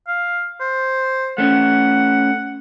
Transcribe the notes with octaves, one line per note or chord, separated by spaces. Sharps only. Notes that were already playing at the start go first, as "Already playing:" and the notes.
F5
C5
A3 C#4 F#5